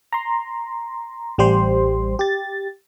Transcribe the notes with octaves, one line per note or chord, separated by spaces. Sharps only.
A#5 C6
A1 G3 G4 C5 C6
G4 A6